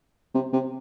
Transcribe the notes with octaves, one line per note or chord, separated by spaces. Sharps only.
C3
C3